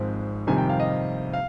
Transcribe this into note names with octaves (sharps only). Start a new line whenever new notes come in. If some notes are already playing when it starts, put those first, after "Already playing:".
Already playing: G#1 G#2 F3 C4
F2 C3 D#3 G3 G#5
G5
F5
D#5
F5